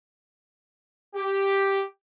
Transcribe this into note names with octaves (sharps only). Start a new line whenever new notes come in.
G4